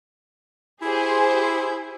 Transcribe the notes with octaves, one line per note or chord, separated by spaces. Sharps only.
E4 G4 G#4 C5